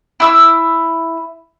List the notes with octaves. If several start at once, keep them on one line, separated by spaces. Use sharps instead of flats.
E4 E6